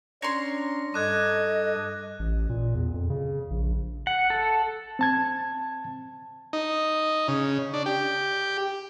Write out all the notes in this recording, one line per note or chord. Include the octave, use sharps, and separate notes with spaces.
C#4 D4 C#5 A#5 C6 A#6
G2 A4 D#5 D6 D#6 F#6 G#6
A1
A#2
E2
F2
C#3
A#1
F#5
A4
C4 A5 G#6
D#4
C#3
D4
G4